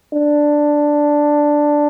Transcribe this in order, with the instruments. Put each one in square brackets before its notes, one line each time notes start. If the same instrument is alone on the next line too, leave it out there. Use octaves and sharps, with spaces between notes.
[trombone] D4